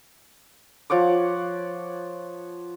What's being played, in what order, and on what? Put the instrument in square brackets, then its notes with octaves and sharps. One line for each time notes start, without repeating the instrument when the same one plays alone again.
[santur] F3 C#5 F#5 D6